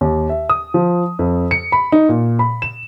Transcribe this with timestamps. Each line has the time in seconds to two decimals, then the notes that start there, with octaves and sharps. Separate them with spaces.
0.01 D#2
0.29 E5
0.50 D#6
0.74 F3
1.19 F2
1.51 C#7
1.72 B5
1.92 D#4
2.09 A#2
2.39 B5
2.62 E7